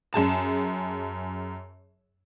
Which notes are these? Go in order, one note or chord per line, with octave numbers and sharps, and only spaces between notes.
F#2 G#4 A5 E7